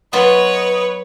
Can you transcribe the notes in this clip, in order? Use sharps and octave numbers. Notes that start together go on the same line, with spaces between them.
F#3 B3 F4 B4 C#5 D#5